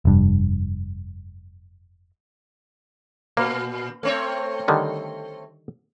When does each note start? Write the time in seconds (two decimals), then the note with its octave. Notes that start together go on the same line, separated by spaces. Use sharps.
0.05 F1 G2
3.37 A#2 A#3
4.03 A3 C4 C#5
4.68 D3 D#3 G3